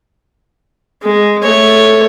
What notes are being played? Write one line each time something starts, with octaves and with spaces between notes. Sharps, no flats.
G#3
A3 C#5